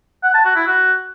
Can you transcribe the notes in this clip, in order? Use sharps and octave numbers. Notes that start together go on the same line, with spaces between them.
F#5
A5
F#4
E4
F#4